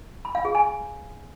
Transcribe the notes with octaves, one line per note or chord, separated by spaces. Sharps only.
B5
F5
G#4
G#5